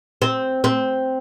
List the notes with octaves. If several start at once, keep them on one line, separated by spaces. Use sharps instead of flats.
C4
C4